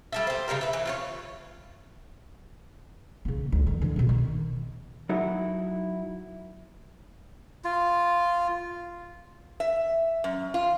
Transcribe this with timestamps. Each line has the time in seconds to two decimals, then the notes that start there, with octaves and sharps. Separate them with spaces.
0.12 G3 A4 E5
0.27 G4 C5
0.48 C#3 D#4 G4 A#4
0.61 B4 E5
0.73 E3
0.85 F4 B4 C#5
3.25 C#3 A#3
3.52 D2
3.67 D#3
3.82 D3 E3
3.96 A#1 C3
4.09 D#3
5.09 F#3 D#4 E4 F#4 A#4 F#5
7.64 F4
9.60 E5
10.24 F#2
10.54 F4